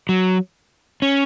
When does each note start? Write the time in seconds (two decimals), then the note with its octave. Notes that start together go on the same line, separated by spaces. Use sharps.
0.09 F#3
1.02 C#4